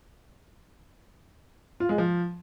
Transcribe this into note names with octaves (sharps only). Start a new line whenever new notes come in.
F4
G#3
F3